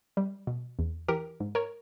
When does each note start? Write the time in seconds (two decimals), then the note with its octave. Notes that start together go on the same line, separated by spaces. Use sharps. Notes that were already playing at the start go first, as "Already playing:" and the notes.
0.17 G3
0.47 B2
0.79 E2
1.08 E3 G4 A#4
1.40 G#2
1.55 A#4 C#5